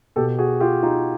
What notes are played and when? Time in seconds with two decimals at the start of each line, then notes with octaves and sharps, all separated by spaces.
0.16 B2 G4 A4
0.38 F#4 G#4
0.60 F4 G4
0.83 D#4 F4